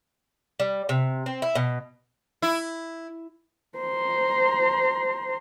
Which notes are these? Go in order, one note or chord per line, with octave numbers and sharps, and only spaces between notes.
G3
C3
C4
E4
B2
E4
C5 A#5